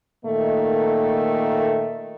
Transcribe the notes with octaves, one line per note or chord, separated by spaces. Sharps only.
A#2 D#3 A3 A#3 A4 D#5